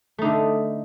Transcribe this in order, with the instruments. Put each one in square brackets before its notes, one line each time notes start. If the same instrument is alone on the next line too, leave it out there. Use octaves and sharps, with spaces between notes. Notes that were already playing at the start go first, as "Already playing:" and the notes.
[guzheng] A3
D#4
D3